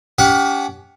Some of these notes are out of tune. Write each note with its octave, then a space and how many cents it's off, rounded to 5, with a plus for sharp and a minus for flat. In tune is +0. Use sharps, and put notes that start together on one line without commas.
C#4 +35 G4 +0 F#5 +0